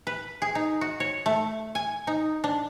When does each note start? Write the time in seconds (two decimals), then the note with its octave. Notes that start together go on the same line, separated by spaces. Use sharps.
0.07 B4
0.42 G#4
0.55 D#4
0.81 F#4
1.00 C#5
1.26 A3
1.75 G#5
2.07 D#4
2.44 D4